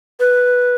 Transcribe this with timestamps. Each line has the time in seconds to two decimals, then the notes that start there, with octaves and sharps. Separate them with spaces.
0.20 B4